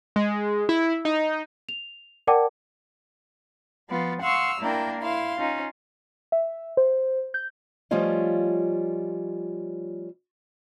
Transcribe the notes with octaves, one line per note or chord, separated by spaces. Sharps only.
G#3
E4
D#4
F7
A#4 D5 F#5 G5 A5 D6
F3 B3 F4
F5 F#5 C6 C#6 E6 F6
A#3 D4 E4 A#4 G5
E4 F5 C6
C#4 D#4 F4
E5
C5
G6
F3 G3 A3 C#4 F4 D#5